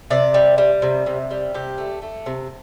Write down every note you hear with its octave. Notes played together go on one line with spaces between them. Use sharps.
C3 D5
G3
G3
C3
C3
G3
C3 G4
A3
A3
C3